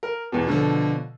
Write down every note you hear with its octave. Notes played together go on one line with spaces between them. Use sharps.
A#4
E2 B2
B2 D3 F3 A4